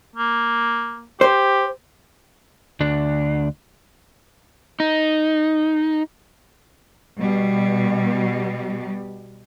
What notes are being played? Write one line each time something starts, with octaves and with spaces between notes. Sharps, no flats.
A#3
G4 C5
D2 D4
D#4
B2 G3